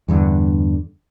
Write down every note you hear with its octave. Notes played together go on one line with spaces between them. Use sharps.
E2 G2 D3